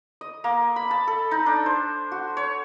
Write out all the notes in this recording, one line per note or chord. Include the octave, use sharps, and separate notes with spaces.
D#5
A#3
B5
A5
A4
D#4
D4
C5
F#4
C#5